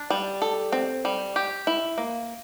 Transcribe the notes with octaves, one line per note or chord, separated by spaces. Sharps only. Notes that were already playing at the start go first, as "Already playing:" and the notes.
Already playing: D4
G3
A4
C4
G3
G4
E4
A#3